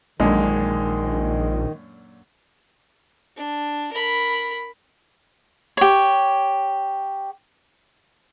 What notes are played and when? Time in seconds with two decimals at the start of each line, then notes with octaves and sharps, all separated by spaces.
0.20 A#1 F#2 A#2 D3 D#3 G#3
3.37 D4
3.92 A#4 B5
5.77 G4 C#5